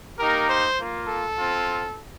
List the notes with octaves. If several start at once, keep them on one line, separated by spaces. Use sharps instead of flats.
A#3 D#4 G4 A#4
C5
A#3 F4
A4
C4 F4